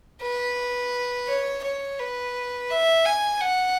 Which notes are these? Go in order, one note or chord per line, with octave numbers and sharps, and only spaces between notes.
B4
C#5
C#5
B4
E5
G#5
F#5